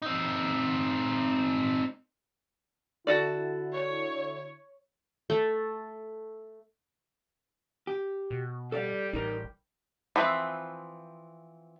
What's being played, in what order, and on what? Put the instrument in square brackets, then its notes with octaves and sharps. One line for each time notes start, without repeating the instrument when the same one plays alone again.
[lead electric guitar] C4 D#4
[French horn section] D3 E4 [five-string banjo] F#4 A4 D5
[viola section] C#5
[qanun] A3
[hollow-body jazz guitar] G4
[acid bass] B2
[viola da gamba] G3 G4 [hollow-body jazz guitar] A4 D5 F5
[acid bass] A1 [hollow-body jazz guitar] D#4 A#4
[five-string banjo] E3 F3 C4 B4 E5